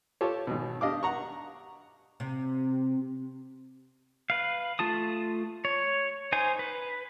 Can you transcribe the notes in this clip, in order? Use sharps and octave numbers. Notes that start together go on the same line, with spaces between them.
F4 G4 A4 C#5
G#1 B2
D4 G4 D#5 F5 D6
F#5 A#5 C#6
C3
B4 F5
A3 F4 A5 D#6
C#5
D#4 C5 G#5
B4